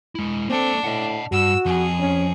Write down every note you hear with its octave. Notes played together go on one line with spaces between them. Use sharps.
G#3 E4
A#3 C4 D4 A4
A2 D#5 F#5
G2 F#4 E6
F2 G#4
C#4